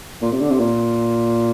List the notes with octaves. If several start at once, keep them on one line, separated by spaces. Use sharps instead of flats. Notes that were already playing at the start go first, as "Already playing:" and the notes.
A#2
C3
D3
C3
A#2